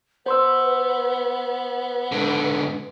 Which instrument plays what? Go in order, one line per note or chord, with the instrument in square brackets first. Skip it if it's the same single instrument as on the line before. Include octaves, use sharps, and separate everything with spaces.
[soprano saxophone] B3 [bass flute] B4 [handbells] C5 C6 E6
[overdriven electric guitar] G#2 D3